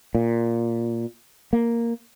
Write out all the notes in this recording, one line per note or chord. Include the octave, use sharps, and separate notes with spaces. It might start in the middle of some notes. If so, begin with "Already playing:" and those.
A#2
A#3